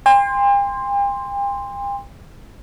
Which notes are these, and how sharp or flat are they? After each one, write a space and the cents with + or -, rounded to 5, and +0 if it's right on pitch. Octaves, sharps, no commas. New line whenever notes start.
G5 +45 C6 +0